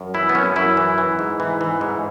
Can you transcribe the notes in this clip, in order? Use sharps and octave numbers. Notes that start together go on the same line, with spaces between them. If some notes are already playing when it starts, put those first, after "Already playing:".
Already playing: F#2
E3 E4
B3
F#2 C#4
F#2 E4
E3
E3
G#2
E3
E3
G#2